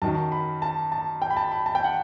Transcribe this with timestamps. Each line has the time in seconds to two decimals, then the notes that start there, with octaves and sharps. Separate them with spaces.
0.02 F#2 D#3 F#3 A5
0.32 B5
0.62 A5
0.92 A5
1.22 G5
1.30 B5
1.37 A5
1.52 B5
1.66 A5
1.75 G5
1.84 F#5